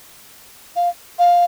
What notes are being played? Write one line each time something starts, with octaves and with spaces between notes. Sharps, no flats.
F5
F5